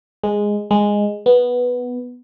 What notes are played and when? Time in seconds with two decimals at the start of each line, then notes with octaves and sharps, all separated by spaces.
0.23 G#3
0.71 G#3
1.26 B3